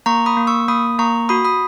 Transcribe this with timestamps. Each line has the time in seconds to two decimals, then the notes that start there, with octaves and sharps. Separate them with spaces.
0.06 A#3 A#5 C#6
0.26 B5 D#6
0.37 A#3
0.47 C#6 E6
0.68 A#3 B5 D#6
0.99 A#3 A#5 C#6
1.29 F#4 B5 D#6
1.45 B5 D#6